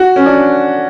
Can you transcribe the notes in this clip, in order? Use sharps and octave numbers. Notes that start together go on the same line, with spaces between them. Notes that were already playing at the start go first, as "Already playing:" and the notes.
Already playing: F#4
C#4
D4